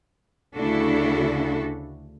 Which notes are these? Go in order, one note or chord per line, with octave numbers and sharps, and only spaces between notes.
D2 C#3 D4 E4 F#4 A4